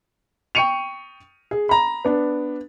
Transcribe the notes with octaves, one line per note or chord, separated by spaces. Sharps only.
G5 C#6 C#7 D#7 F7
G#4
A#5 B5
B3 D4